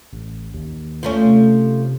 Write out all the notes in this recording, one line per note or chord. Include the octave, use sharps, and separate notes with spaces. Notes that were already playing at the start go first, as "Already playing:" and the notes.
A1
D#2
F3 A3 C#4
C3